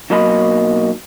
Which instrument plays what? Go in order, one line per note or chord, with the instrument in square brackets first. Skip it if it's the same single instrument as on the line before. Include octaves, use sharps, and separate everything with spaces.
[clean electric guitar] B1 F#3 A#3 D#5 A#5 B5